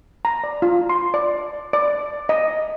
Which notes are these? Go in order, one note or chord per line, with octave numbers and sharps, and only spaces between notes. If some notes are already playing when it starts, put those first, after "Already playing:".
A#5
D5
F4
C6
D5
D5
D#5